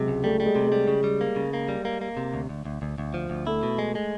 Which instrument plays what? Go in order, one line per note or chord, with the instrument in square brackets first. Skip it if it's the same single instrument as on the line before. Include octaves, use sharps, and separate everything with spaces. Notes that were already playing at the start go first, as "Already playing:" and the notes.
Already playing: [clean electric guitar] C3 [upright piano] F#3 G#3
[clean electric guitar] C#2
[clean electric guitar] G3 [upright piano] A3
[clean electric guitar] G3
[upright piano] G#3
[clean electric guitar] C3
[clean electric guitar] G3 [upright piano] G#3
[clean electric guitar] C#3
G3
A#3
C#3
A#3
G3
A#3
A#3
C3
D2
D2
D2
D2
D2
F3
D2
[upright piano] A3 [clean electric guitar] E4
[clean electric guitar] B2
G#3
G#3